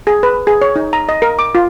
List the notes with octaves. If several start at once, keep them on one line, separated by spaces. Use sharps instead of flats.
G#4
B4
G#4
C#5
D#4
A#5
D#5
A#4
D6
F4